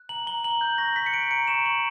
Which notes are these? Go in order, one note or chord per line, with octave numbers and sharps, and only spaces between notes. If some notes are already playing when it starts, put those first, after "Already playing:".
Already playing: F#6
A#5 F#7
A#5 G7
A#5 F#7
F#6 G6
C#6 A#6
F#6 B6
C#7
F#6 D7
A#5 D7
C#6 E7
C#6 F#7